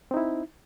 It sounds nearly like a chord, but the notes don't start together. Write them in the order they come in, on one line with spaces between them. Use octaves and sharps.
C4 D#4 E4